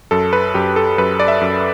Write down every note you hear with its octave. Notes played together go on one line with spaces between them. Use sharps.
F#2 A4
B4
F#2 G4
A4
F#2 B4
D5
E5
F#2